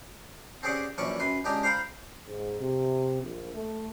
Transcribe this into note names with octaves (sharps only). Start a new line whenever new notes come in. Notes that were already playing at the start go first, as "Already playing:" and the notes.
C4 C#4 G4 G#4 D5 F#5
A#1 F#2 E3 C#4 D5 C#6
F#2 B4 C6
C#2 D4 G4 D#5 G#5 A#5
C5 F5 G5 A#5 B5
G#2
C3
A#1
A3